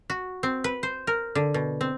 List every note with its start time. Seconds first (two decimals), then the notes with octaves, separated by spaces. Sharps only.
0.10 F#4
0.43 C4
0.64 B4
0.83 C5
1.07 A#4
1.35 D3
1.54 B2
1.81 C4